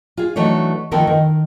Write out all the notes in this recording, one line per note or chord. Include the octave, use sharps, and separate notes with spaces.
F4 G#4
E3 F#3 A3 D4 D#4 C#5
D#3 F3 A3 B3 A4 A#4
D#3